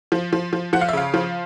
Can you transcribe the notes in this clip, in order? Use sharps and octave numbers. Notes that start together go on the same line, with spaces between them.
F3
F3
F3
F3 F#5
F5
E5
C#3 F5
F3